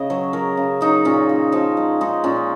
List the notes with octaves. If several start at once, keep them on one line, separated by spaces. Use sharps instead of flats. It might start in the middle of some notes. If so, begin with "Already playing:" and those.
Already playing: C#3 D#5
F#3 C#5
F#3 A#4
C#3
F#3 D#4
A#2 C#4
A#2
F3 D#4
G#3
G#3 D#4
A#2 C#4